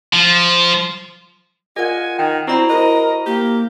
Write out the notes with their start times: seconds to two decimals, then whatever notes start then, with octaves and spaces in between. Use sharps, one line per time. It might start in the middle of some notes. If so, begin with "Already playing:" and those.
0.13 F3
1.76 F4 G#4 A#4 D5 D#5 F#5 G#5
2.19 D#3 G5
2.47 C4 E4 F#4 D5 A#5 B5
2.69 E4 G#4 A#4 C5 D#5
3.26 A#3 G4